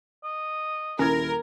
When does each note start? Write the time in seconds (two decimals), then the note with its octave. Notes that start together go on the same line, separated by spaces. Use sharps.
0.24 D#5
0.99 D#1 C#4 E4 A#4 G#6